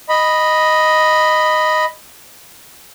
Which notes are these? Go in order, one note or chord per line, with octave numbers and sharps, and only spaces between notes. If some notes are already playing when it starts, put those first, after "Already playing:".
D#5 B5